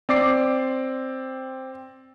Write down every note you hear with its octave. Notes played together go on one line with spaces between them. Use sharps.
C4 D5 D6 C7